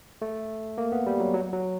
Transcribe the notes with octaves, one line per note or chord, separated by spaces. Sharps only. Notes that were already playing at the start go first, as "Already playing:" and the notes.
A3
A#3
B3
G3
F#3
F#3
F#3